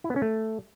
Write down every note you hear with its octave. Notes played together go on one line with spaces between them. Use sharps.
E4
B3
C#4
A3